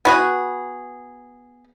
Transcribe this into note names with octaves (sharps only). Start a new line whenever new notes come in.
B3 F#4 G#4